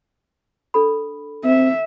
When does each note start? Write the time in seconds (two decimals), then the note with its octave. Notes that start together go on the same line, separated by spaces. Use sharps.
0.74 D4 A4 B5
1.45 C4 E5